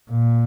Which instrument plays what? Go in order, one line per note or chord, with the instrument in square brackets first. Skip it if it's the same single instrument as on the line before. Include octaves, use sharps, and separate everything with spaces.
[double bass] A#2